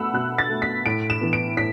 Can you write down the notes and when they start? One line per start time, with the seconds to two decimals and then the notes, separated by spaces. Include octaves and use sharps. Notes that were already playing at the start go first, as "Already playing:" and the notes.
Already playing: B2 A3 F#5 B5 E6
0.14 B2 F#6
0.38 A6
0.49 A3
0.62 B6
0.86 A2 D7
1.10 E7
1.21 E3 B3
1.33 D7
1.57 A2 B6